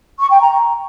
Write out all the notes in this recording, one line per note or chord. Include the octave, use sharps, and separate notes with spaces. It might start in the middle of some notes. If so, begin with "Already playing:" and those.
C#6
G5
A#5